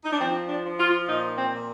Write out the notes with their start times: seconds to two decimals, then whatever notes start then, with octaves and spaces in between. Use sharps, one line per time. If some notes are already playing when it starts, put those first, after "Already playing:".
0.04 D#4
0.11 D4
0.19 F3 C4
0.48 D4
0.64 F3
0.78 F4
1.08 A#2 D#4
1.38 C4
1.53 A#2